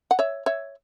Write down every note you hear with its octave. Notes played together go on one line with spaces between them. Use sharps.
F#5
C#5 E5
C#5 E5